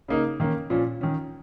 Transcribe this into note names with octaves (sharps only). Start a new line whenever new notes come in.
C#3 A#3 D#4
D#3 A#3 C#4
A#2 F3 C#4
D#3 C#4